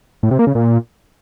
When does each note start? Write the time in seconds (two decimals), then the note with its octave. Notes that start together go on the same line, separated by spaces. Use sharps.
0.23 A2
0.31 C3
0.39 A#3
0.47 C#3
0.55 A#2